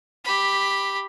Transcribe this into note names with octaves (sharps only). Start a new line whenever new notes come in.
G4 B5